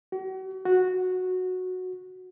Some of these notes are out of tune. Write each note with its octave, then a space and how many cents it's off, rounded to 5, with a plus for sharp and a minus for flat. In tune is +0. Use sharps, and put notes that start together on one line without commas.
F#4 +40
F#4 -10